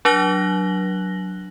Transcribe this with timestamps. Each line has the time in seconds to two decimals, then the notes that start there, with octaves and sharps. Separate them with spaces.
0.05 F#3 D4 F#6 A#6 F#7 G7